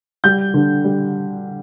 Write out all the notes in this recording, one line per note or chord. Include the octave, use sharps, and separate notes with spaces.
G3 G6
D3
G3